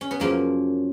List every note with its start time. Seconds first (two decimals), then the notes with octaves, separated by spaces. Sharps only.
0.01 C#4
0.11 B3
0.20 F#2 C#3 F3 A#3